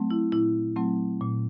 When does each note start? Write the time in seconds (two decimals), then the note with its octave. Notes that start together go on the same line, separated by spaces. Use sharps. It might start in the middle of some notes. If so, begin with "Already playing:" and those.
Already playing: F#3 A3 C4
0.10 E4
0.32 A#2 E4
0.76 F#3 A3 C4
1.21 A#2